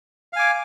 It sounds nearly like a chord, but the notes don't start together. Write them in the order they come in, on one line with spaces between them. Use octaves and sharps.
F5 G#5 D6